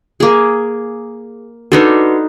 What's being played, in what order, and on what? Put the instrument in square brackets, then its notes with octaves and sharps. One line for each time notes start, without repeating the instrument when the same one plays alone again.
[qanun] A#3 G#4
[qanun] D4 D#4 A4 [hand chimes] F#4 B4